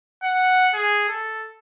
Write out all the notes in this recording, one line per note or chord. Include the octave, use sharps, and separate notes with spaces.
F#5
G#4
A4